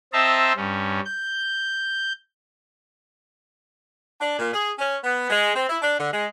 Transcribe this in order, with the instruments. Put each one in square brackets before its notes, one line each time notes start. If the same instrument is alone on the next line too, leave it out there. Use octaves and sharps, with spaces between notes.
[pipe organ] C4 C5 D#5 E5 A5 A#5
G2 C#4
G6
[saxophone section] D4
A#2
G#4
C#4
B3
G#3
C4
E4
D4
D3
G#3